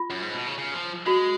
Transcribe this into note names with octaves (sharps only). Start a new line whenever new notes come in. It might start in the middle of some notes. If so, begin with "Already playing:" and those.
Already playing: F4
F#2
G#2
B2
C#3
C#3
F3
G#3 F#4